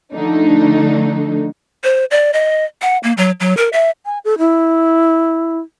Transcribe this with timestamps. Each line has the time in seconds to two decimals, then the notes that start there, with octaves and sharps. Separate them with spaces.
0.14 D3 F3 A3 D4 D#4
1.84 C5
2.11 D5
2.33 D#5
2.82 F#5
3.03 A#3
3.17 F#3
3.40 F#3
3.57 A#4
3.73 E5
4.06 G#5
4.25 A4
4.39 E4